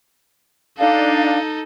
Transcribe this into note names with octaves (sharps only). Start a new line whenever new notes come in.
D4 D#4 A4 F5